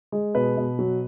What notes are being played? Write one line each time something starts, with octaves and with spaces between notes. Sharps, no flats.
G#3
B2 B4
B2
F#3